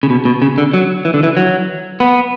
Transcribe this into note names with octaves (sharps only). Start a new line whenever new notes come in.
C#3
B2
B2
C#3
D3
F#3
E3
D3
E3
F#3
B3